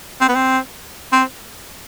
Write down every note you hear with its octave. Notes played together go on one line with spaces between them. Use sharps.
C4
B3
C4
C4